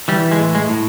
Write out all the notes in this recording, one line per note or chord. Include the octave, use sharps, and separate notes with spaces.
E3 G3
G#3
A2
G#3
A2